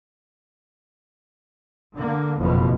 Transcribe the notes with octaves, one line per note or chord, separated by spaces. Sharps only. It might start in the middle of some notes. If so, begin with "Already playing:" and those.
D3 A#3
F#1 F2 B2